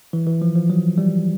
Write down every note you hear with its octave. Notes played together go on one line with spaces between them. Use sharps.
E3
E3
F3
F3
F#3
G3